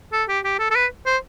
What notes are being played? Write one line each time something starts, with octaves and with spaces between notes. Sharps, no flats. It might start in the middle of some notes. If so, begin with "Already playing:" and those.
A4
G4
G4
A4
A4
B4
C5